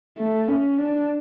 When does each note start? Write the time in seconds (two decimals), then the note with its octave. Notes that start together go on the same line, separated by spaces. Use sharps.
0.18 A3
0.48 C#4
0.78 D4